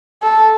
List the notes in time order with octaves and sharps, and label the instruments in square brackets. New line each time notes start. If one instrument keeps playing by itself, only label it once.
[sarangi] A4